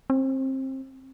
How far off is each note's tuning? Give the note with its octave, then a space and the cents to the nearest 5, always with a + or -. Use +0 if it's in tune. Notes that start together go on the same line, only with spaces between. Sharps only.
C4 +25